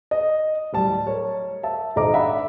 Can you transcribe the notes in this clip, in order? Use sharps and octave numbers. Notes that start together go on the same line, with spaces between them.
D#5
D1 G3 A5
A#4 C#5
E5 A5
G#1 A4 D#5 A#5 D6
D4 D5 E5 F#5 B5